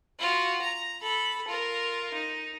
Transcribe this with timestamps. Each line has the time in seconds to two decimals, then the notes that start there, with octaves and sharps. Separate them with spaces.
0.19 F4 F#4
0.62 A#5
1.02 A4 B5
1.48 F4 A#4
2.14 D#4